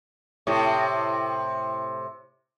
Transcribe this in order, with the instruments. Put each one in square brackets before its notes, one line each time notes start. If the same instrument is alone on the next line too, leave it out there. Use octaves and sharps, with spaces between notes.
[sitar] A2 C3